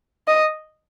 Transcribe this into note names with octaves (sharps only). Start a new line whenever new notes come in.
D#5